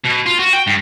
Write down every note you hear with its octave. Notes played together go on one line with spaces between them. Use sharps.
B2
F4
F#4
G5
G2